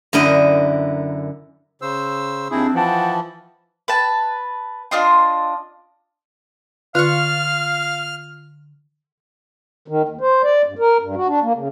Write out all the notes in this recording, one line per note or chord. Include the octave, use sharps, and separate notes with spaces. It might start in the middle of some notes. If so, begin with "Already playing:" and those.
F#2 D3 E4 A#4 D#5
C#3 C5 E6
D#2 C4 D4 E4 G#4
E3 F3 F#5 G5 A5
B4 A5
D4 F4 D#5 C6
D3 F4 B4 F5 C#6 F6
D#3
D#2
C5
D5
G2
A#4
G2
F#4
D4
A#3
C#3